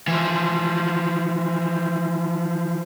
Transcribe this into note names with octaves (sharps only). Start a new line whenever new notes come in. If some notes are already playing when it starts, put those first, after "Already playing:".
E3 F3